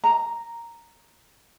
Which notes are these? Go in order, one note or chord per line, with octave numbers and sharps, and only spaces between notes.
A#5